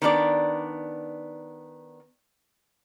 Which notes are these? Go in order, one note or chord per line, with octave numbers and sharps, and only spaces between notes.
D#3 B3 D4 D5